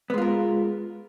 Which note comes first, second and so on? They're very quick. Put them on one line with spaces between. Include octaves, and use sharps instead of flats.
B3 G#3 F4 A#4